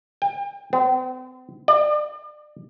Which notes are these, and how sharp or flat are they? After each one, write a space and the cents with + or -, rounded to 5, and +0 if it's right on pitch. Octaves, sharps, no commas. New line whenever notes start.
G5 +40
C4 -40
D5 +35